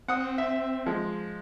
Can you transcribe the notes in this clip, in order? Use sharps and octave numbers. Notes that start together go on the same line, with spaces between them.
C4 F#5 D#6
E5
F3 G#3